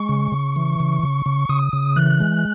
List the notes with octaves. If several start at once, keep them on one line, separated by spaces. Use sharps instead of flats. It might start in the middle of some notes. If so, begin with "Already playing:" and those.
Already playing: G#3 C#6
C#3
C#3
E3
C#3
C#3
C#3
C#3 D#6
C#3
E3 F#6
G#3